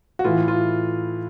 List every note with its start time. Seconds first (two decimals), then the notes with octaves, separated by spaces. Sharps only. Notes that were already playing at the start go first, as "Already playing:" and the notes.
0.19 F#4
0.25 A2 E3 F4
0.48 F4